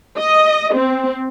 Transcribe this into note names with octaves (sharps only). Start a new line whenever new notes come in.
D#5
C4